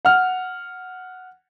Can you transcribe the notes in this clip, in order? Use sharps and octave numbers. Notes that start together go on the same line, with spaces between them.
F#5 F6